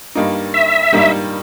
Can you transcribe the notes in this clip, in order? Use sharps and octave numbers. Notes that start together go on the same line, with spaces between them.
G2 G3 A#3 D#4
E5
G2 G3 A#3 D#4